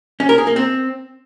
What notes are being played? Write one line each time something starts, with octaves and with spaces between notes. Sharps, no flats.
C#4
A#4
G#4
A#3
C4